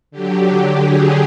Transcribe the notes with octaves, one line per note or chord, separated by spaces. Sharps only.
D3 F#3 G4
G#4